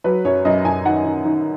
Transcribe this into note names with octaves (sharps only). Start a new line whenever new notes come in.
F#3 B4
F#2 C#5
F#2 D#5
F#2 G#5
D#3 F#5
D#3
D#3